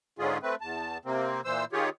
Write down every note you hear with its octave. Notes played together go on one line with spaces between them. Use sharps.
G#2 D3 G#3 C#4 F4 G#4
A3 C4 B4
E2 A5
C3 A#3 C4
A#2 E3 C5 E6
D#3 F4 G4 G#4 C#5